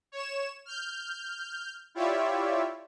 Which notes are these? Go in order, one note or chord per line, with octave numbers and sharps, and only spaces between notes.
C#5 E7
F6 G6
E4 F4 G4 C#5 D5 E5